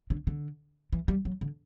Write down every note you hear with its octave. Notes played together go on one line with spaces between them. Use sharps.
D3
D3
E3
G3
F#3
D3